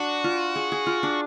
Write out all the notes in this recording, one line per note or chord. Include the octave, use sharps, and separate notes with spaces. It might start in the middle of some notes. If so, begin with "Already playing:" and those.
Already playing: D4 F#4
F4
G#4
G#4
F4
D4